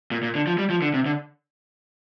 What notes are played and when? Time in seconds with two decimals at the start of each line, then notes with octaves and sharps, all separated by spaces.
0.11 A#2
0.23 A#2
0.35 D3
0.47 F3
0.58 G3
0.70 F3
0.82 D3
0.94 C3
1.06 D3